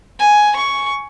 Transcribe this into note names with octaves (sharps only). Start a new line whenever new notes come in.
G#5
C#6